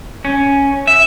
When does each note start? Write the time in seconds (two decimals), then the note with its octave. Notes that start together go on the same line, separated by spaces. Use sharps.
0.25 C#4
0.87 E5